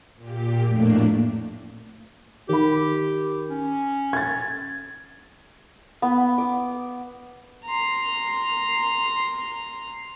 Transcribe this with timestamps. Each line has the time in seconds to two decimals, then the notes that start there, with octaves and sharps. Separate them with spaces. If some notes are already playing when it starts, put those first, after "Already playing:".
0.16 A#2 G4
0.64 F2 A2 A3 A#3 D4
2.49 D#3 G4 B5
3.50 C#4
4.13 G#6 A6
6.02 B3
6.38 D6
7.66 A#5 C6